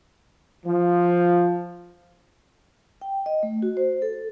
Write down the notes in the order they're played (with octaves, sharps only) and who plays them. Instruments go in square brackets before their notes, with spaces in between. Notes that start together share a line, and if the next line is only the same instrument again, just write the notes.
[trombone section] F3
[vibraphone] G5
D#5
A3
F#4
C5
A4